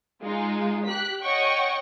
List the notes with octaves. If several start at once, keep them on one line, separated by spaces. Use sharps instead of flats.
G#3 D#4 F4
G4 F#6 B6
C#5 D#5 F#5 G5 C#6